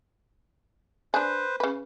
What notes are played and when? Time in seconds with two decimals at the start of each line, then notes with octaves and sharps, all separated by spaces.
1.14 D4 G#4 B4 C5
1.60 C#3 B4